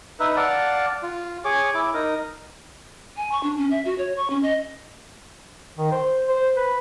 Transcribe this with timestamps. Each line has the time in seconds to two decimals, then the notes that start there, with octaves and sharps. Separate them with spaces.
0.20 D#4 B4 E5
0.37 D5 F5 F#5 A5
1.03 F4
1.45 G#4 C#5 D6
1.74 E4 D6
1.94 D#4 A#4
3.17 G#5
3.32 C#6
3.43 D4
3.58 C#4
3.71 E5
3.85 F#4
3.98 C#5
4.17 C#6
4.30 C#4
4.43 D#5
5.78 D#3
5.92 C5
6.29 C5
6.57 B4